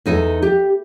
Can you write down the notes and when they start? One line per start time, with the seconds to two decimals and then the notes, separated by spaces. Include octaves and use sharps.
0.06 E2 D#4 A4 G#5
0.42 G4